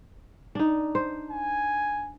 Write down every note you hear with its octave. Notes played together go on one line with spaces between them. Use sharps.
D4 D#4
C5
G#5